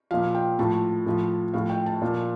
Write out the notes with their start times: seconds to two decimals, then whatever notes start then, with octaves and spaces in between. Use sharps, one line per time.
0.11 A#2 F3 F5
0.35 G5
0.59 A2 F3 A5
1.06 A2 F3
1.54 A2 F3 F5
1.70 G5
1.86 A5
2.02 A#2 F3